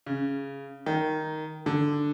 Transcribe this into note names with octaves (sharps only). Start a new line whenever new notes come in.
C#3
D#3
D3